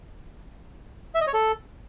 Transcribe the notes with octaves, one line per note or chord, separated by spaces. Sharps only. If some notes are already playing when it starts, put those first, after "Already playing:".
E5
D#5
C#5
A4